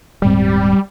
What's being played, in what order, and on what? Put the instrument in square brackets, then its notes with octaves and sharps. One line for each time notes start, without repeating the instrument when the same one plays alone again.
[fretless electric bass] D#1 G#2 C4 [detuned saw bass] G3